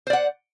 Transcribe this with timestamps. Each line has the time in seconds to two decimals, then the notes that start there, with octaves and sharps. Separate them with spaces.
0.07 C5
0.10 D5
0.13 F#5